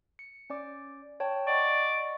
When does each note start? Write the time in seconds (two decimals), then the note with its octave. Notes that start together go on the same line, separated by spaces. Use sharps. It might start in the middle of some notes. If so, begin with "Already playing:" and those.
0.19 C#7
0.50 C#4 D5 D6
1.20 C#5 G5 A5
1.47 D5 D#5 F#5 C#6